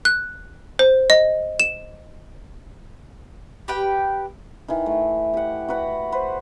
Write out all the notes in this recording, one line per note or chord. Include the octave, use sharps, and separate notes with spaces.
F#6
C5
D#5
E7
G4 B4 G5
D#3 E3
A3
G4 F#5
F#4 B4 F#5 B5
B4 C5 F#5